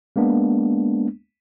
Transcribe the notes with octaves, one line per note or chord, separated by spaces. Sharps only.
G#3 A#3 B3 D4